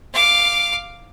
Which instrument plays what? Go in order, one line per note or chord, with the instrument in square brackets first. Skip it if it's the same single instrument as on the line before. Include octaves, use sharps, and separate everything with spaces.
[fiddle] F5 D6